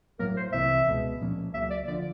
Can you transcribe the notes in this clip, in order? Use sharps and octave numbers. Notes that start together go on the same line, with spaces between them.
A2 F#3 A#3 A#4
C5
C2 C3 E3 E5
C#2 B2 G#3
A#2 F3 A#3 C#4
C#2 C#3 F#3 A#3 E5
D5
D3 F3 D5